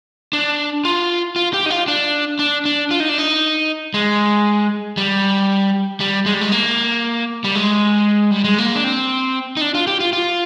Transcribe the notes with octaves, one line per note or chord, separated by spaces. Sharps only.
D4
F4
F4
G4
D#4
F4
D4
D4
D4
F4
D#4
D4
D#4
G#3
G3
G3
G#3
G3
G#3
A#3
G3
G#3
G3
G#3
A#3
D4
C4
D#4
D4
F4
G4
F4
F4